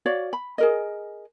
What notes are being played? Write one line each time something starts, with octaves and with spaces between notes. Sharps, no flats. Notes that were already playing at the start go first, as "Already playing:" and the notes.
F#4 C#5 D5 F5
B5
G#4 A#4 D#5